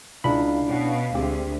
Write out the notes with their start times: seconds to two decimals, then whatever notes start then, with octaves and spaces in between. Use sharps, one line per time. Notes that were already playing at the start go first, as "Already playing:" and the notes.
0.24 C#2 D4 E4 F5 B5
0.69 B2 C#4 F#5
1.15 D2 G#3 C4 G4 G5